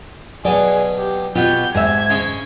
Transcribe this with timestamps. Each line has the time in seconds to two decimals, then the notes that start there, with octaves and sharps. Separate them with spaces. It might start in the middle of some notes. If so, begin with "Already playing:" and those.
0.45 B2 F#3 G#4 D5
0.97 G4
1.35 B2 F#3 F4 G4 G6
1.75 G#2 E5 G#6
2.10 C#3 G#3 C#4